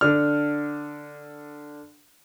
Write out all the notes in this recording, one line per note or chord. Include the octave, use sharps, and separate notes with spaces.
D3 D4 F6